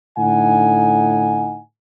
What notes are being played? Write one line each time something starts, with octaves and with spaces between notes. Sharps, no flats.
A2 D3 D#4 F#5 G#5